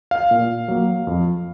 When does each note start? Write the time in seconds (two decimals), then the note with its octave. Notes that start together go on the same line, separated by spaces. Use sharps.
0.11 F5
0.31 A#2
0.68 F#3 A#3
1.07 F2